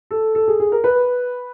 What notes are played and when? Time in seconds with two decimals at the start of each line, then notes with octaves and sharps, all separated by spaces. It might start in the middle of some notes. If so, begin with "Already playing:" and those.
0.11 A4
0.35 A4
0.48 G#4
0.60 G#4
0.72 A#4
0.84 B4